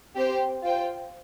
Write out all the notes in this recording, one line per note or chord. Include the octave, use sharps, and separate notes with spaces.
C4 G4 C5 G5
F4 C5 G5